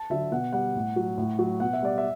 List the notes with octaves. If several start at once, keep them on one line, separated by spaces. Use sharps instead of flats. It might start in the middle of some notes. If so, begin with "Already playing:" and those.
Already playing: A5
D3 F#3 E5
B2 F#5
G3 F#5
A2
F#3
A2
F#3
B2 F#5
E5
G3 D5
E5